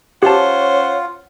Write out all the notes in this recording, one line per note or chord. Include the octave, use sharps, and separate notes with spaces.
C#4 F4 G4 C5 C#5 F#5 A5